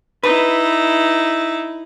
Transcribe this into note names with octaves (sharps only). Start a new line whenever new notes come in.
D#4 E4 B4